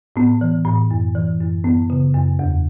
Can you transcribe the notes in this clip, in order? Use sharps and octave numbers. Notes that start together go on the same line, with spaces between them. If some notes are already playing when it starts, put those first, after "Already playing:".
A2 B3
E3
A2
F#2
E3
F#2
F#2 B3
C#3
F#2
E2